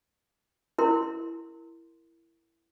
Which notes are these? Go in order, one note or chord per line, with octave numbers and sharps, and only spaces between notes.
E4 A#4 C6